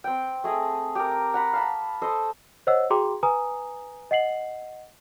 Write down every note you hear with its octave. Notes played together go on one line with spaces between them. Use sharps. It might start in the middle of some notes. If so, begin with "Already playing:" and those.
C4 G5
A3 G#4 D#5
G4 A#4
F#5 A#5 B5
F5 A5 B5
A4 C5 D#5
C5 C#5 D#5 F#5 E6
F#4 G#4 G5 A#5 C6 D6
B4 G#5 A#5 D#6
D#5 F#5 C7 F#7